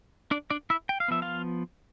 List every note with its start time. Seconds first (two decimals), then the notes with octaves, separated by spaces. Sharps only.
0.31 D4 D5
0.50 D4 D5
0.70 E4 E5
0.89 G5
1.00 F5
1.08 F3 B3 E5
1.22 F4 F5